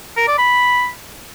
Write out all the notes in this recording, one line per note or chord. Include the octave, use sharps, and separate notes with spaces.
A#4
D5
B5